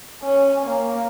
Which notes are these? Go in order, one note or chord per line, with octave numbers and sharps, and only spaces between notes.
C#4
A#3